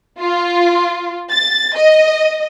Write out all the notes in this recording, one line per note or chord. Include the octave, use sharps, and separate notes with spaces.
F4
A6
D#5